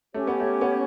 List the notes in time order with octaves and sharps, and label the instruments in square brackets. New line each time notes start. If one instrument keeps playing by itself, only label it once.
[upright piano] A3 [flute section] C#4 G4 C#5
[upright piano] B3
A3
B3